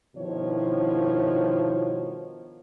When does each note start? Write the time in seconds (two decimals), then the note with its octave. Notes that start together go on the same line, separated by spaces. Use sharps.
0.16 G2 B2 D#3 F3 E4 C#5